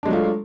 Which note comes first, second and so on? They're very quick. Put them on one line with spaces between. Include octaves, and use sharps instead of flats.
D4 G#3 F#3 A3 F4